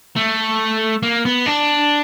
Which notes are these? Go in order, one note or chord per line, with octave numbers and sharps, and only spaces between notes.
A3
A#3
B3
D4